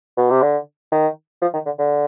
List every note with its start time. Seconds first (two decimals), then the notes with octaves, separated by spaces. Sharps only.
0.17 B2
0.30 C3
0.42 D3
0.92 D#3
1.42 F3
1.53 D#3
1.66 D3
1.79 D3